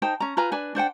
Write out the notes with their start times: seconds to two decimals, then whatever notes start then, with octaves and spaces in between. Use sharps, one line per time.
0.02 D#4 C5 G5 A5
0.20 C#4 A#5
0.37 F4 B4 G#5 A#5
0.52 D4 B4 G#5
0.75 D4 C5 F#5 G5